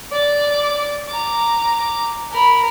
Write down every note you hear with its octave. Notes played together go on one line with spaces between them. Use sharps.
D5 D6
A#5 D6
A#4 B5